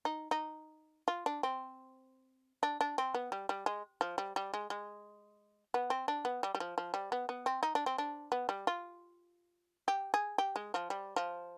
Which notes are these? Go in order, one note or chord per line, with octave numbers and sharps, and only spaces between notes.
D#4
D#4
F4
D4
C4
D4
D4
C4
B3
G3
G3
G#3
F3
G3
G3
G#3
G#3
B3
C4
D4
B3
G3
G3
F3
F3
G3
B3
B3
C4
D#4
D4
C4
D4
B3
G3
F4
G4
G#4
G4
G#3
F3
G3
F3